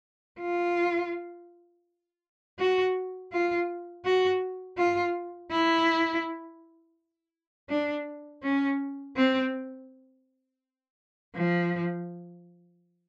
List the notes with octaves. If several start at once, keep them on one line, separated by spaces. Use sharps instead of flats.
F4
F#4
F4
F#4
F4
E4
D4
C#4
C4
F3